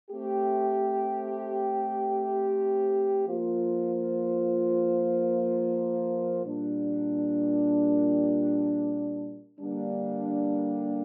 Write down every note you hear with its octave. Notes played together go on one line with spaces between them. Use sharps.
A3 C4 G4
F3 A#3 F4 C5
A#2 G3 D4
D3 G3 A#3 D4